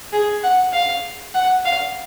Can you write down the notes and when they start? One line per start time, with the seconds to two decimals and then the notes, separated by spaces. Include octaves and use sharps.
0.12 G#4
0.43 F#5
0.73 F5
1.34 F#5
1.65 F5